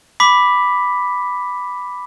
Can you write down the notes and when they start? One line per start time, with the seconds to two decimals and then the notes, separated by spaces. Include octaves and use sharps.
0.20 B5 D6 B6